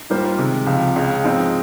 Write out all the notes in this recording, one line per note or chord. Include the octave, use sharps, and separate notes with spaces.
G#2 G3 A#3 F4 C5
C3 D#3 G#3
C#2 C3 F3
C#2 C#3 G#3
G#2 F3 G#3 C4 D#4